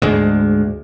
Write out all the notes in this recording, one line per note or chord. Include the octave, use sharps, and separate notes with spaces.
D2 G#2 G#3